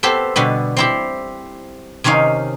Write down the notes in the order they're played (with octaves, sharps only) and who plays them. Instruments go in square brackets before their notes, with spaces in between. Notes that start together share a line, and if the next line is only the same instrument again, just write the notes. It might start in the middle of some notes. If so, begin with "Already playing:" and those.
[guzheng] B3 C4 G4 A4 C5
B2 D3 G3 B3
C4 E4 G4
C3 D#3 C#4 D#4 F5